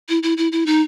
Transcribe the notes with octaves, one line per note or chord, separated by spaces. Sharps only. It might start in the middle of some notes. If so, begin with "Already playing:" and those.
E4
E4
E4
E4
D#4